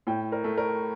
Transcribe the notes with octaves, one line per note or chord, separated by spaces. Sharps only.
A2 G5
A#4
A3
A#4